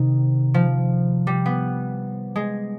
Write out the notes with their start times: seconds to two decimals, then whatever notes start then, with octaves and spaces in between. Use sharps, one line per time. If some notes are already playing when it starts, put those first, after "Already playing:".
Already playing: C3 D#3
0.54 F3
1.27 G3
1.46 B3
2.36 G#3